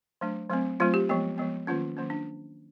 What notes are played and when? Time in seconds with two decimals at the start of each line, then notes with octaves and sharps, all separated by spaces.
0.21 F#3 A3 D4
0.50 F#3 A3 C4
0.80 F#3 A3 C4 F4
0.94 G4
1.09 F3 G#3 B3
1.38 F3 G#3 B3
1.67 D#3 F#3 A#3 C#4 F4
1.97 D#3 F#3 A#3 C#4
2.10 D4